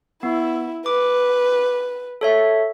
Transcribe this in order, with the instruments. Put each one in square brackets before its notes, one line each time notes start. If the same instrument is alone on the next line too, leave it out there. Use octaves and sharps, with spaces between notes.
[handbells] B3 [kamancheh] E4
[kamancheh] B4 [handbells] D6
[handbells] A4 C#5 E5